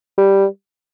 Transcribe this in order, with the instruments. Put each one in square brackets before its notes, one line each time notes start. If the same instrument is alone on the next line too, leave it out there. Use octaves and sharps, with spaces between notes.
[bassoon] G3